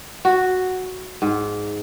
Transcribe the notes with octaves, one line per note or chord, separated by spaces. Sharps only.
F#4
G#2